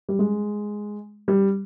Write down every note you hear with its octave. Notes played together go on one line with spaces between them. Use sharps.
G3
G#3
G3